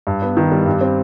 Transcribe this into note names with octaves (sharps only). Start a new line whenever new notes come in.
G2
B3
D#3
G3
G2
C4